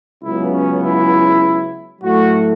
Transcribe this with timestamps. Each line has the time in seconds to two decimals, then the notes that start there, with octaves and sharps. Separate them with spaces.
0.22 C#2 C#3 F#3 B3 E4
0.53 C#4
0.82 E4
2.01 A2 F#3 A3 F#4